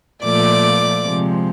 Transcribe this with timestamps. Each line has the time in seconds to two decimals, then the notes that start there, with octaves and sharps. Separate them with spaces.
0.23 A#2 F3 A3 D5 D6
1.04 C3 F3 G#3